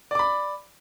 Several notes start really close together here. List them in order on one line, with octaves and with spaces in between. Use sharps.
D5 D6 B5